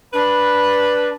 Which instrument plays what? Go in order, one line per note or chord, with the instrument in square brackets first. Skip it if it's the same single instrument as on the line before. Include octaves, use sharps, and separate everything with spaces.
[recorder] D4 [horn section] B4